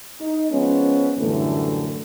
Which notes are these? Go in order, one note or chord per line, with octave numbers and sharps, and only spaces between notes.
D#4
F3 G#3 B3 C#4
F#2 A2 D3 E3 G3 A3